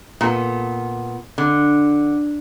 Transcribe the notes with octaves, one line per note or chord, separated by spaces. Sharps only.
A#2 B3 A4
D3